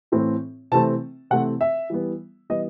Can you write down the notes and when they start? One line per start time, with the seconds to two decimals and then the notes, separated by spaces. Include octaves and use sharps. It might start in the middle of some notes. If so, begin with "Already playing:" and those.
0.12 A2 E3 A3 C4
0.72 C3 E3 A3 C4 A5
1.31 C3 E3 A3 C4 F#5
1.61 E5
1.90 E3 G3 B3
2.50 E3 G3 B3 D#5